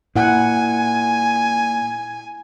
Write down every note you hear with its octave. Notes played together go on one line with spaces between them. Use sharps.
A#2 E4 F#5 G#5